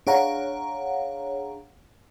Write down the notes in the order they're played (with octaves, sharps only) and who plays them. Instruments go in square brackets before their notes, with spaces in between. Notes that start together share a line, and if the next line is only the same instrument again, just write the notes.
[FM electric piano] D4 G#4 C#5 F5 F#5 A#5